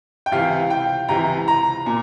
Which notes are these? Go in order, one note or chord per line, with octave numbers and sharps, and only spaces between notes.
G5
C#2 C3 E3 F5
G5
C#2 C3 E3 A#5
A#5
A#2